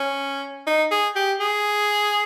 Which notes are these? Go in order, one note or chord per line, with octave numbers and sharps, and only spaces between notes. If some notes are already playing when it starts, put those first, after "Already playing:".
Already playing: C#4
D#4
G#4
G4
G#4